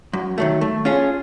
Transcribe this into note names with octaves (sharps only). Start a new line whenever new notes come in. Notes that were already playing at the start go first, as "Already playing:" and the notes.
F#2
D#3 F#3 A3
A3
C#4 F4 G#4